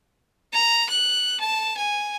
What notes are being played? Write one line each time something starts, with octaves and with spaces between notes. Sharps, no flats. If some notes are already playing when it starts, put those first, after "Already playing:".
A#5
F#6
A5
G#5